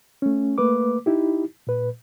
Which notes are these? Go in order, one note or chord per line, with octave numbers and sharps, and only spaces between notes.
A3 C#4
A3 A#3 B4 D6
D#4 E4 G4
A#2 B4